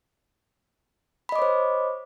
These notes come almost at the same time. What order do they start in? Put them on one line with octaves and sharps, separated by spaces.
B5 D#5 D6 C#5 C5